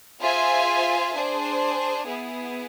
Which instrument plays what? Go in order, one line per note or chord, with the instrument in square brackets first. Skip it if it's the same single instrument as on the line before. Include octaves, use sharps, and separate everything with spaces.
[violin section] F4 G#4 C5 E5 G#5
D4 G#4 C5
B3 E4 G#4